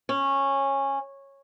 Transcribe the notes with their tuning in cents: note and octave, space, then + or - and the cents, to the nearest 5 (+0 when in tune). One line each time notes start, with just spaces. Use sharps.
C#4 -15